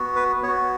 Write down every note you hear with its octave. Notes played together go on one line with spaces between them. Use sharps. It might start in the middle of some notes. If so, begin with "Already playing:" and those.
Already playing: B3 F#4
B4
B3 F#4 C#5